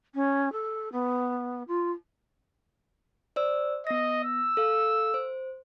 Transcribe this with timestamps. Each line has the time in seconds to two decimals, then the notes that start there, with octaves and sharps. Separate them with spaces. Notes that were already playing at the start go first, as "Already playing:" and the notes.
0.15 C#4
0.52 A4
0.92 B3
1.68 F4
3.36 C5 D5 E6
3.87 B3 D#5 A#6
4.24 E6
4.57 A4 F5
5.14 C5